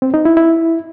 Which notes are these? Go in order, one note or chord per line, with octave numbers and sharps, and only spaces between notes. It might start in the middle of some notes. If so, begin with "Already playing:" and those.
C4
D#4
E4
E4